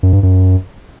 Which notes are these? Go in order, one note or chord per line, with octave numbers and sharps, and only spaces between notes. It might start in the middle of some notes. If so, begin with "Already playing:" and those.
F#2
G2
F#2